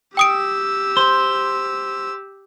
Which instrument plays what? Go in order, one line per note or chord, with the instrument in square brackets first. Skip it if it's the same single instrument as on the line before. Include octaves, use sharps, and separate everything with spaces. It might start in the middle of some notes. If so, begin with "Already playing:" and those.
[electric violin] G4 E6 [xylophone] G5 D#6 D7
[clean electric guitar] C5